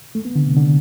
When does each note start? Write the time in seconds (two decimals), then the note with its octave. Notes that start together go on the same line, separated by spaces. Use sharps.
0.15 A3
0.25 B3
0.36 D3
0.47 C3
0.57 D3